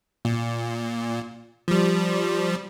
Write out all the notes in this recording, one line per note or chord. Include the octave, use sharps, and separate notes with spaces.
A#2
F3 G3